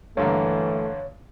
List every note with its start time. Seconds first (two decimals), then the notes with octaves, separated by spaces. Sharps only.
0.17 G2 D3 E3 A3 A#3 C#5